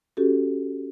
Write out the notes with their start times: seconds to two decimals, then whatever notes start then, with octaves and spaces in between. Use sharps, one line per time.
0.17 C#4 F#4 G4 A4